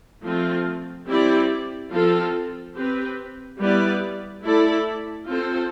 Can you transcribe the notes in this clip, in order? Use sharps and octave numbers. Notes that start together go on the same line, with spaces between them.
F3 A3 C4 F4
G3 C4 E4 G4 D5
F3 C4 F4 A4
C4 G4 B4
G3 B3 E4 B4 D5
A3 E4 A4 D5
C4 F4 A4 C5